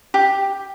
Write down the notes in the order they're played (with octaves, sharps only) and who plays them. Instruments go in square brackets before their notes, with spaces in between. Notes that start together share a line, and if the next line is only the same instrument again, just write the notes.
[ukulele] G4